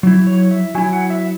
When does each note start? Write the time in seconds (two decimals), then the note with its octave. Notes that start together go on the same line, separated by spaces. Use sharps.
0.03 F#3 E4
0.27 C#5
0.51 E5
0.75 F#3 E4 G#5
0.93 F#5
1.10 E5